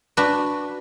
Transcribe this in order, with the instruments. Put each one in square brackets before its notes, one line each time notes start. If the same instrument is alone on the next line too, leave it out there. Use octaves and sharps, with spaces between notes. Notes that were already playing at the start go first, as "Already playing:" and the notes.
[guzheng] D4 F#4 B4